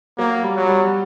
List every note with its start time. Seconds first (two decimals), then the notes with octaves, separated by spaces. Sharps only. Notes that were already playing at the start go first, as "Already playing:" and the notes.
0.18 F#3 A#3
0.43 G3
0.56 F#3
0.68 G3